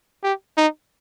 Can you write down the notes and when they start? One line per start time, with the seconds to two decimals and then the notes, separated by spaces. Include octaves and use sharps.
0.23 G4
0.57 D#4